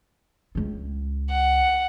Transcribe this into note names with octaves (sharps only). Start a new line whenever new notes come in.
C#2 F4
F#5